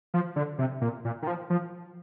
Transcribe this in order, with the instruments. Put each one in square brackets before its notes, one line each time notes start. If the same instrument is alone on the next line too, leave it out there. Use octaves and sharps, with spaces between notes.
[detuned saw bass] F3
D3
C3
A#2
A#2
D#3
F3
F3